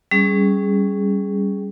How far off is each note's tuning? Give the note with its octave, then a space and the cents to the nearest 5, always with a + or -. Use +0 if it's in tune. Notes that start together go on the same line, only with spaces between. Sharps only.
G3 +0 C#4 +0 G#4 +0